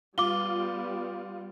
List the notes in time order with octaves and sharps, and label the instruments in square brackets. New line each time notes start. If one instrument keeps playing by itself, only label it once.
[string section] G3 B3 [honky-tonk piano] F4 [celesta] D6 G7